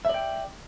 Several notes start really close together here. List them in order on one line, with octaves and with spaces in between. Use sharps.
E5 D5 G5